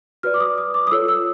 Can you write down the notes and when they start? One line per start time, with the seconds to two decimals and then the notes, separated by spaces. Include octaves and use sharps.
0.23 F#4 B4 D5 F6
0.34 D6
0.40 D#6
0.58 D#6
0.74 D6
0.87 D#6
0.91 F4 A4 C#5 E6
1.08 E6